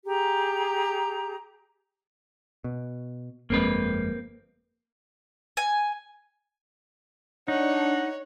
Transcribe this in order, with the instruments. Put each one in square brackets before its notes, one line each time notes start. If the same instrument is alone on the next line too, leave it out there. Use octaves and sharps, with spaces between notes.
[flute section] G4 G#4 A#5
[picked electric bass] B2
[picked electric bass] G1 F2 G#3 [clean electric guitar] A#3 C4 B4
[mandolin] G#5
[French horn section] D4 [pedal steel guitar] D#4 [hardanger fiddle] C#5 [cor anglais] F#5